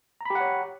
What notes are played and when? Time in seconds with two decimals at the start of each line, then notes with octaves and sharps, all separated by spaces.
0.21 A#5
0.25 B5
0.30 G4
0.35 F#5
0.40 C#5